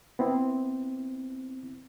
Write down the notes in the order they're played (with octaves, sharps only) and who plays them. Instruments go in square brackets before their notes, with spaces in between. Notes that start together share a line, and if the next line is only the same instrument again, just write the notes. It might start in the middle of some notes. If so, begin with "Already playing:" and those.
[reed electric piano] B3 C4 E4